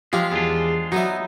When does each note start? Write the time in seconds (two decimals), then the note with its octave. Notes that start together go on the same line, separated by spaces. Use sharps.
0.13 F3 G#3 F4 G4 F5
0.32 E2 G#3 D4 F4
0.92 F#3 B3 D#4 F#4 D5 E5